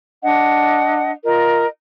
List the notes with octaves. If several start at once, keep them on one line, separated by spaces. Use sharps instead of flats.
D4 D#5 F#5
F4 A#4 D#5